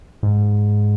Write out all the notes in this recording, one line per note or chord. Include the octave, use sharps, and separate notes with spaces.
G#2